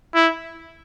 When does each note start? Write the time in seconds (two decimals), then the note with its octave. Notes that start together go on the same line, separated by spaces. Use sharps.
0.15 E4